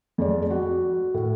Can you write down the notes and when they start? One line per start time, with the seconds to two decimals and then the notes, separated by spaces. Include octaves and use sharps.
0.18 F2 G#3 D5
0.50 F#4
1.14 A2